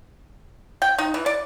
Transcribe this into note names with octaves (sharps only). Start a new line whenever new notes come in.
G5
D#4
E3
D5